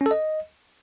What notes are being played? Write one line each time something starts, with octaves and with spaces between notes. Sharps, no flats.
C#4
A4
D#5